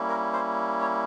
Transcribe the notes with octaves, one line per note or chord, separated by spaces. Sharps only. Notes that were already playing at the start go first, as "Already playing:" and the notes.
Already playing: G3 A#3 C#4 E4
A#4
C5
C#5